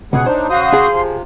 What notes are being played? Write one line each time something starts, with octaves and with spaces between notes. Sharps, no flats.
C#2 B2 G#4 F#5
A2 D4 D#4 C5
C#3 F#4 F5 C6 D#6 G6
G#4
C3 F3